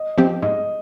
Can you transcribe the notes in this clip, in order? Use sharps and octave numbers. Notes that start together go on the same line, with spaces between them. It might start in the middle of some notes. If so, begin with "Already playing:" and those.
Already playing: D#5
F3 C4 G4
G#2 D#5